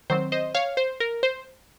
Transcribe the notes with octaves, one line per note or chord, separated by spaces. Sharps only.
D#3 F#3 C4 C5
C5 D#5
C#5 F5
C5
A#4
C5